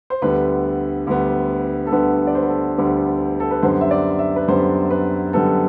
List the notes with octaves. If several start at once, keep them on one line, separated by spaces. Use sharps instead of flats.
C5
D2 D3 G3 B3 B4
D2 D3 G3 B3
A4
D2 D3 G3 B3 B4
D5
C5
B4
A4
D2 D3 G3 B3
A4
B4
F#2 D3 G3 B3 C5
E5
D5
E5
B4
F#2 D3 G3 B3 C5
B4
F#2 D3 G3 B3 A4